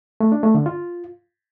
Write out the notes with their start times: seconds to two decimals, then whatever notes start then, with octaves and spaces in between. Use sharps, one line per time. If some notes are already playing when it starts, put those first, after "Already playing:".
0.20 A3
0.32 D4
0.43 A3
0.55 D3
0.66 F4